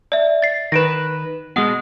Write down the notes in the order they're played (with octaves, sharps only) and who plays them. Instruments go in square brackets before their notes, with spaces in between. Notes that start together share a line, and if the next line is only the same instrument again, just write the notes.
[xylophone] D5 E5
A6 C7
[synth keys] D#3 B4 [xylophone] A#6 D7 E7
[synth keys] B2 G#3 [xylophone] F#5 D#6